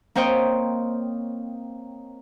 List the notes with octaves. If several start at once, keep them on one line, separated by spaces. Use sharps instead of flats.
A#3 C4 C5 C#5 D#5 G5